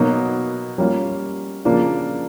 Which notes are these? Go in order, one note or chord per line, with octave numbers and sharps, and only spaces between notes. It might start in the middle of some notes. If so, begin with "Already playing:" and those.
Already playing: B2 F#3 A#3 D#4
G3 A#3 C#4 F4
C#3 F3 A#3 D4 F4